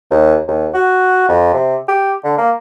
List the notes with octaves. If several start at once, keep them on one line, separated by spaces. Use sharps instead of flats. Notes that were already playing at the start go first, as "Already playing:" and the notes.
D#2
D#2
F#4
F2
C3
G4
D3
A#3